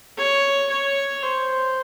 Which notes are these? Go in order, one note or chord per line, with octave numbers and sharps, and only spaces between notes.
C#5
C#5
C5